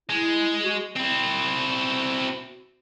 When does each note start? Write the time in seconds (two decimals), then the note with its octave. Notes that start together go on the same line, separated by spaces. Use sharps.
0.10 G#3 E4
0.65 F#4
0.96 C4 E4